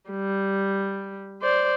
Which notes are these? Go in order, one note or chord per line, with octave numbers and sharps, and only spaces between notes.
G3
C5 D5